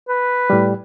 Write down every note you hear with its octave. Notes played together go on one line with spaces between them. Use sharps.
B4
A2 G3